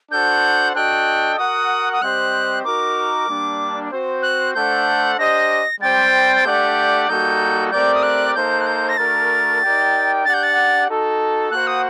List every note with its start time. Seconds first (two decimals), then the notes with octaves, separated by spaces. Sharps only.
0.11 D4 F#4 A4 C5 F#5 G6
0.75 D4 F#4 A4 D#5 G5 F#6
1.38 F#4 A#4 F#5 D#6
1.93 D#6
2.01 G3 C4 G4 C5 D#5 F#6
2.64 D#4 F#4 A#4 D6
3.28 G3 A#3 D4
3.91 C4 F#4 C5
4.22 F#6
4.55 A3 D4 A4 C5 F#5 G6
5.18 D4 G4 C5 D#5 A#6
5.81 G3 C4 G4 C5 G5 A6
6.36 A6
6.45 A3 D4 G4 D5 F#5 G6
7.07 G3 A#3 D#4 F#4 A4 G6
7.71 A3 C4 G4 A#4 D5 G6
7.94 D#6
8.03 F#6
8.35 A#3 D#4 A4 C5 G6
8.61 F#6
8.66 G6
8.89 A#6
8.97 A3 D4 F#4 A#4 A6
9.61 D#4 G4 A#4 D5 G5
10.25 D4 G4 D5 F#5 A6
10.34 G6
10.43 A6
10.88 D#4 F#4 A4
11.51 A#3 F#4 C5 F#5 F#6
11.67 D#6